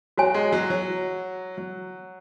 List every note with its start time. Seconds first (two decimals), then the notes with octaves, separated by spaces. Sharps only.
0.18 F#3 F#4 C#5 G#5
0.35 G#3
0.53 F#3
0.70 F#3
1.58 F#3